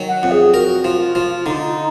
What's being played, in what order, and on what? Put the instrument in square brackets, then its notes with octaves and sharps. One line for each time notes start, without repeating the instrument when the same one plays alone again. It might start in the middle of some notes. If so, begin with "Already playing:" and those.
Already playing: [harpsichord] D#3 F#3
[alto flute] F#5
[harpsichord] F2
[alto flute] G#4
[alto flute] F#4 [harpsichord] A#4
[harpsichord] F3
[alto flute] F4
[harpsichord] F3
[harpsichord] D3 [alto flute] D#4